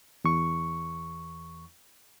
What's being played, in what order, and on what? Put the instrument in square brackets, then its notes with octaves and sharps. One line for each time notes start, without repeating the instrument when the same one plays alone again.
[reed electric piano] E2 C#6